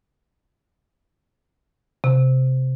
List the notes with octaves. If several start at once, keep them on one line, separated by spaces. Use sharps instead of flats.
C3